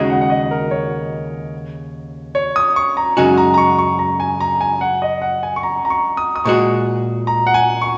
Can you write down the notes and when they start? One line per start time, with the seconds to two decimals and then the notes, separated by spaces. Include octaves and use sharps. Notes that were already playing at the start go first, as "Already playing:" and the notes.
Already playing: D#2 C#3 G#3 D#4 F#4 D#5
0.10 F#5
0.21 F#5
0.30 D#5
0.51 A#4
0.71 C#5
2.35 C#5
2.56 D#6
2.76 C#6
2.97 A#5
3.17 F#2 C#3 G#3 D#4 F#4 G#5
3.37 A#5
3.54 A#5
3.58 C#6
3.78 C#6
3.99 A#5
4.20 G#5
4.40 A#5
4.61 G#5
4.81 F#5
5.02 D#5
5.22 F#5
5.43 G#5
5.56 C#6
5.63 A#5
5.85 A#5
5.90 C#6
6.17 D#6
6.36 D#6
6.45 A#2 G#3 F#4 C#6
7.27 A#5
7.47 F#5
7.54 G#5
7.82 C#6